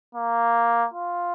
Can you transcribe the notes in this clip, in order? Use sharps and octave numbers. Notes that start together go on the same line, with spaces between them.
A#3
F4